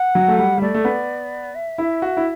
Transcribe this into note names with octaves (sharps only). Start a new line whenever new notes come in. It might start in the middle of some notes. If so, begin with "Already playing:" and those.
Already playing: F#5
F#3
A3
G3
G3
A3 D5
A3
B3
E5
E4
F#4
E4